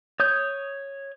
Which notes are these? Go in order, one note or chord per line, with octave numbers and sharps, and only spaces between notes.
C#5 D#6 G6